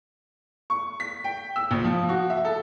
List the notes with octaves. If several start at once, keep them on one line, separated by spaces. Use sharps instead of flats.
C#6
B6
G5
E6
A#1
F3
F#4
E5
A4